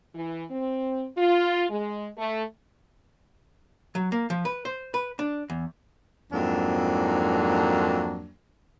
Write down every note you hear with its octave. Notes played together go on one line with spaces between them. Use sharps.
E3
C4
F4
G#3
A3
F#3
A#3
F3
B4
C5
B4
D4
E2
F2 G#2 F#3 A#3 D4